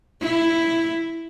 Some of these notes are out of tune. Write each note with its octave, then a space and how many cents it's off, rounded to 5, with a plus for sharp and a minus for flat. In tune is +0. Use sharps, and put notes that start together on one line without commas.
E4 +5